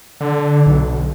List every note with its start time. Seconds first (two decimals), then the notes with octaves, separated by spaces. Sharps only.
0.21 D3
0.66 B1